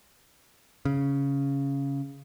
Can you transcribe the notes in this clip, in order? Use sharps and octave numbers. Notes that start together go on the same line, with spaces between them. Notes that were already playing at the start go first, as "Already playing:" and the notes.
C#3